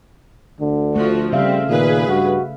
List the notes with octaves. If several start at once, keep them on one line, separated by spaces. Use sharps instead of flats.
D2 D3
F3 A3 F#4
C#3 G3 C4 E5 F5
A#2 D#3 G#4 B4
G2 F#4